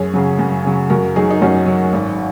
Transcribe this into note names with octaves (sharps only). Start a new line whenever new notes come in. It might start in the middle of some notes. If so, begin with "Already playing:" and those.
Already playing: F#2 G#4 C#5
C#3 F#3
F#2
C#3 F#3
F#2 F#4 A#4
F#3 D#4 G#4
D#4
F#2 C#4 F#4
F#3
G#1